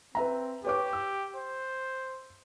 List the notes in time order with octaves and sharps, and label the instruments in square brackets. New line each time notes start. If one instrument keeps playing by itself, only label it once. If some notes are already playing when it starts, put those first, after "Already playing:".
[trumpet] C4 [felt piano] B4 E5 A#5
[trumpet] G4 [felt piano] B4 C#5 D6
[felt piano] E6
[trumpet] C5